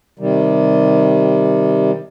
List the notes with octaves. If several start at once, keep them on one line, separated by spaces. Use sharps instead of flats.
C3 D#3 G3